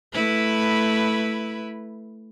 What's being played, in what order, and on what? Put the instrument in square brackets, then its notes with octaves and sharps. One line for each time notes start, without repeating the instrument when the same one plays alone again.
[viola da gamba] A3 E4 B4